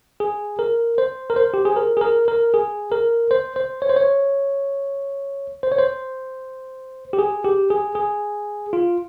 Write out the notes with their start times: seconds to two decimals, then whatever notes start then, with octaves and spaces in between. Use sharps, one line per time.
0.20 G#4
0.59 A#4
0.98 C5
1.30 A#4
1.36 C5
1.54 G4
1.65 G#4
1.76 A#4
1.97 G#4
2.01 A#4
2.28 A#4
2.54 G#4
2.92 A#4
3.31 C5
3.56 C5
3.82 C#5
3.89 C5
3.96 C#5
5.63 C5
5.72 C#5
5.78 C5
7.13 G4
7.19 G#4
7.44 G4
7.70 G#4
7.95 G#4
8.73 F4